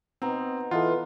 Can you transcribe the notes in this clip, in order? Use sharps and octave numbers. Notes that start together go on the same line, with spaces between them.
B2 C4 D#4 A#5
E3 F4 A4 D#5 F#5